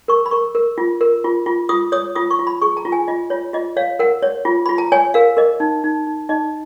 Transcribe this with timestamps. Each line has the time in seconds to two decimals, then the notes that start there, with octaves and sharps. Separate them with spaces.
0.08 A#4 C#6
0.26 B5
0.31 A#4 C#6
0.55 A#4
0.78 F4
1.01 A#4
1.24 F4
1.46 F4
1.69 F4 D#6
1.92 C#5 D#6
2.15 F4 D#6
2.31 C#6
2.39 F4
2.47 B5
2.62 G#4 C#6
2.77 A#5
2.85 F4
2.92 G#5
3.08 F4 D#5
3.30 F4 C#5
3.53 F4 D#5
3.77 C#5 F5
3.99 A#4 F#5
4.23 C#5
4.45 F4
4.66 F4 B5
4.78 A#5
4.92 C#5 G#5
5.14 A#4 F5
5.37 A#4 D#5
5.60 D#4
5.84 D#4
6.07 D#4
6.29 D#4 D#5